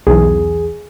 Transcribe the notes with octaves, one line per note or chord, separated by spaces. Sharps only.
B1 E2 G#4